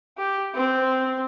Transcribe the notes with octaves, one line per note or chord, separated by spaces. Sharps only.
G4
C4